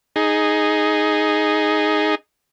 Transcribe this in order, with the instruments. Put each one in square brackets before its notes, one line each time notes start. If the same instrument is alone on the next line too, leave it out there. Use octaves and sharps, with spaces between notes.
[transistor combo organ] D#4 G#4